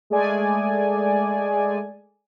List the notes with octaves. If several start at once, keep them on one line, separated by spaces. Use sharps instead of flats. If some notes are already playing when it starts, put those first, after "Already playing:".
G#3 A3 G#4 D5 G#5